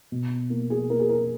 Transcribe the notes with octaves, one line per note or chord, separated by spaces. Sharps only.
B2
A#3
G#4
A#3 A#4
G#4
A#4